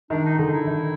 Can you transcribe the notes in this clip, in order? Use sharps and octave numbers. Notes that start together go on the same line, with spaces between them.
D#3 D4
D#4
D3 D#4
E4
D#3